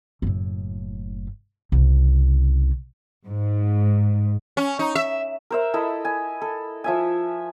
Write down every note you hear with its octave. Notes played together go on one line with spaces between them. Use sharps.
F#1 A2
C2 C#3
G#2
C#4
D#4
E5
A#4 C5 E5
E4 A4 D#5 B5
G#5
A4
F3 E5 G#5